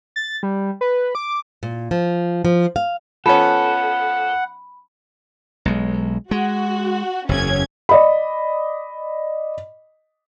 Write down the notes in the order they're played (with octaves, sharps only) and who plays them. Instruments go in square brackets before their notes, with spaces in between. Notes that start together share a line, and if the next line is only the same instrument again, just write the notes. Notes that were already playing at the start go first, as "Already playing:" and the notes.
[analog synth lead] A6
G3
B4
D6
[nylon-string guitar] A#2
F3
F3
F5
[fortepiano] F3 B3 C#4 [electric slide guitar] A4 [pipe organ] F#5 [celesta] B5
[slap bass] B1 G#3
[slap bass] G#3 [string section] F#4
[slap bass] F#1 E2 [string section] C#4 G#6
[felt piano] D5 D#5 B5